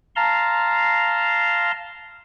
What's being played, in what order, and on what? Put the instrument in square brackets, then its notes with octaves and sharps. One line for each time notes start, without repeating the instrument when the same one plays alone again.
[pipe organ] F5 A5 A#5 C6